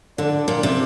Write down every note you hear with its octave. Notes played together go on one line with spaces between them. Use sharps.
D3 D4
A#2
C3